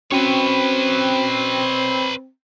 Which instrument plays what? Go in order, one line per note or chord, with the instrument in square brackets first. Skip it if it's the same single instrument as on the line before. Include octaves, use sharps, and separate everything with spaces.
[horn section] C4 [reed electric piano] C#4 F#4 G5 [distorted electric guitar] B4 C#5